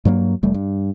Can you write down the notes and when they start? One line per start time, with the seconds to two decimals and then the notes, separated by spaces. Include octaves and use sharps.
0.05 G2 F#3 A3 A#3
0.43 F1 G3 A3
0.54 G2